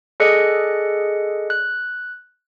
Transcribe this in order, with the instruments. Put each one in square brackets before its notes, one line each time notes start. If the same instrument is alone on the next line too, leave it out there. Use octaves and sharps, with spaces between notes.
[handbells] G#4 A4 D5 D#5 F#6 C#7
F#6